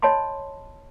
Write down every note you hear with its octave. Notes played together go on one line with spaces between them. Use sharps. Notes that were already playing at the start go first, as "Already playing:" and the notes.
C#5 D#5 A5 B5 C6